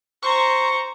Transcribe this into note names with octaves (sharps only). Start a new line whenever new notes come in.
C5 A#5 C#6